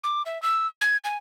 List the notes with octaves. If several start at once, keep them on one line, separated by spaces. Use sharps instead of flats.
D6
E5
E6
G#6
G#5